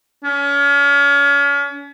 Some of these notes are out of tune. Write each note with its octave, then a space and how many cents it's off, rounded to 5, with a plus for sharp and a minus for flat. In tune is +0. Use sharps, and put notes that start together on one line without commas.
C#4 +35